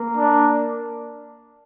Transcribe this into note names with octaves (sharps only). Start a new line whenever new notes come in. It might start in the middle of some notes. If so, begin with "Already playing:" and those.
Already playing: A#3
D4